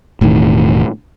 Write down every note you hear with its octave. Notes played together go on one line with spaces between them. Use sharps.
E1 A2 D#3